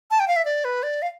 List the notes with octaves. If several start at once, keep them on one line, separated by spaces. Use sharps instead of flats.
A5
G5
F5
E5
D5
B4
D5
F5